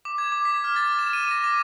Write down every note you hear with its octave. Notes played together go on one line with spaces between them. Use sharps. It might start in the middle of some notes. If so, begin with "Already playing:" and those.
D6
G#6
D6
B6
F6
A6
E7
D#7
A#6
D6